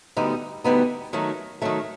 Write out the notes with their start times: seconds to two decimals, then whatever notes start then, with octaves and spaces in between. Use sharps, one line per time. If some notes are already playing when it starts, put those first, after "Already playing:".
0.17 D2 D3 G3 B3 D#4
0.64 D2 D3 G3 B3 D#4
1.13 D#3 F#3 A3
1.62 D#3 F#3 A3